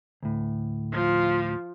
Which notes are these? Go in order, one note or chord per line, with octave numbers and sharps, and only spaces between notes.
D2 A2
F3